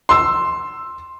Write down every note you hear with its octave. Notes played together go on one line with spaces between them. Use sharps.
C6 E6